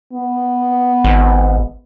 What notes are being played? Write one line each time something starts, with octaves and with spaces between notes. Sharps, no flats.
B3
G#1